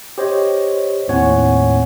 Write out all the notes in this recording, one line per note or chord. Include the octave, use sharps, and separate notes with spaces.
G4 C5 C#5 D#5
D#2 A2 C4 C#5 F#5 G#5